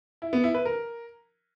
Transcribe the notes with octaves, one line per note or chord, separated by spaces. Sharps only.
E4
B3
E4
B4
A#4